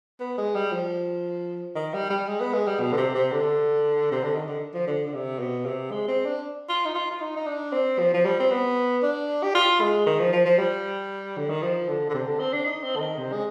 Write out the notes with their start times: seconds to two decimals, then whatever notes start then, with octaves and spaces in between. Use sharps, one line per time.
0.20 B3
0.38 G#3
0.55 G3
0.72 F3
1.75 D#3
1.94 G3
2.10 G3
2.28 G#3
2.40 B3
2.53 G#3
2.67 G3
2.80 B2
2.92 D3
2.97 C3
3.14 C3
3.32 D3
4.11 C3
4.23 D3
4.36 D#3
4.48 D3
4.74 F3
4.87 D3
5.07 D3
5.14 C3
5.39 B2
5.66 C3
5.91 G#3
6.08 C4
6.25 D4
6.69 F4
6.85 D#4
6.95 F4
7.11 F4
7.21 D#4
7.36 D#4
7.47 D4
7.73 C4
7.99 F3
8.14 F3
8.25 G3
8.40 C4
8.51 B3
9.03 D4
9.43 G4
9.55 F4
9.81 G#3
10.06 D#3
10.20 F3
10.33 F3
10.45 F3
10.58 G3
11.37 D3
11.49 D#3
11.62 F3
11.88 D3
12.10 D3
12.14 C3
12.27 D3
12.40 C4
12.53 D4
12.66 D#4
12.83 C4
12.96 D3
13.01 D#3
13.18 C3
13.33 G#3